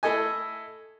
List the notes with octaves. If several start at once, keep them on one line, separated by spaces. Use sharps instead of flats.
A3 E4 A4 D#5 G#5